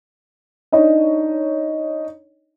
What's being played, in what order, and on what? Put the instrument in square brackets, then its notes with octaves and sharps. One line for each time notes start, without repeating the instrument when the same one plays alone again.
[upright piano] D4 D#4 C#5 D#5